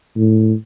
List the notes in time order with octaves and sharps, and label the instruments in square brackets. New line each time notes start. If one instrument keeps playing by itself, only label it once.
[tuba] A2